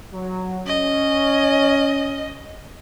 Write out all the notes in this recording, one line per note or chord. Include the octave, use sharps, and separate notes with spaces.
F#3
C#4 D#5